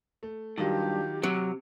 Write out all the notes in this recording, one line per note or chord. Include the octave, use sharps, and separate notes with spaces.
A3
G2 D#3 F#3 F4 G4
C3 F#3